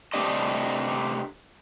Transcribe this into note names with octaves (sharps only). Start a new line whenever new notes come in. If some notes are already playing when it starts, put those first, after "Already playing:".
C3 A3 D4 G4 D#5